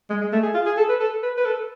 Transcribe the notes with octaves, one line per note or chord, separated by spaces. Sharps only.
G#3
G#3
A3
G#4
F4
G#4
A4
B4
A4
B4
B4
A4